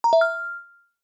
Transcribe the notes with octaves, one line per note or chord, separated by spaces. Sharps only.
A#5
E5
F6